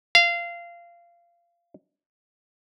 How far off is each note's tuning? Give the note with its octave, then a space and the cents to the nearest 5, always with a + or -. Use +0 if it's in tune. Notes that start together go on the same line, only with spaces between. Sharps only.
F5 -20